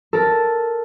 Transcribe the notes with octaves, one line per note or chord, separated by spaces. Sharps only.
A4 A#4